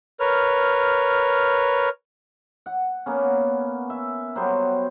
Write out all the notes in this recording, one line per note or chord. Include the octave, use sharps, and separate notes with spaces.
A#4 B4 C#5 F6
F#5
A#3 B3 C#4
E5
F#3 G3 B3 C5